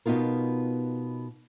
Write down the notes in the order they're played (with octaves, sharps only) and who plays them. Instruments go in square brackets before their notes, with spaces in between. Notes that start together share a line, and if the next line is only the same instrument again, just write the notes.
[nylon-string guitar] B2 B3 D#4 F4 A#4